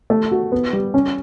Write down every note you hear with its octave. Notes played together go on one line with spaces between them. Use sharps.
A3
F#4
B3
G3
C#4